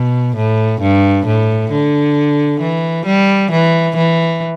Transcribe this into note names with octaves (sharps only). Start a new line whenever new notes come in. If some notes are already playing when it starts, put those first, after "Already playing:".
Already playing: B2
A2
G2
A2
D3
E3
G3
E3
E3